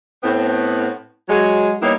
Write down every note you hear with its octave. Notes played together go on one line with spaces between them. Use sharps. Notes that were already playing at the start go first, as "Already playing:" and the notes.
A2 B3 C4
F#3 G#3 G#4
G3 A#3 B3 D#4 E4 C#5